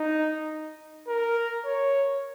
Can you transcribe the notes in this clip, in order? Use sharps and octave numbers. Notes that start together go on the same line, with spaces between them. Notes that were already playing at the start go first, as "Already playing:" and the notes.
Already playing: D#4
A#4
C#5